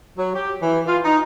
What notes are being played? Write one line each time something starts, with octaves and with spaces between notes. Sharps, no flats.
F#3
G4
E3
F4
D#4